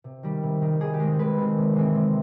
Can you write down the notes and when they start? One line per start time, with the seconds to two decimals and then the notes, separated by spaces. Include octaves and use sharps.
0.04 C3
0.23 D#3 G3
0.43 C3
0.62 D#3 G3
0.80 D#3 G#4
0.94 G4
0.99 G#3 C4
1.19 D#3 B4
1.38 G#3 C4
1.57 C3
1.74 E3 G#3 C4
1.95 C3